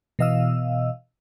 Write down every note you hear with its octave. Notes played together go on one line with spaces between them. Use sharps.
B2 E3 D#5 F5 E6